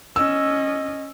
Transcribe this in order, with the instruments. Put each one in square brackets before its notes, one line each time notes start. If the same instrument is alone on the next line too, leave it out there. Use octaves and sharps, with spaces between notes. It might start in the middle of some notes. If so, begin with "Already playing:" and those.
[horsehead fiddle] C#4 D#5 [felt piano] E6